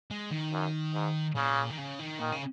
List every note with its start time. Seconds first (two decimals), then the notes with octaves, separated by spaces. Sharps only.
0.11 G#3
0.31 D#3
0.52 F#2
0.94 G#2
1.36 A#2 C#3
1.70 D#3
1.78 C#3
1.99 D#3
2.19 A#2 D#3
2.32 C#3